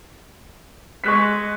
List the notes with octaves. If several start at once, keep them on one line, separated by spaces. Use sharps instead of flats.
G#3 C#6 F#6 B6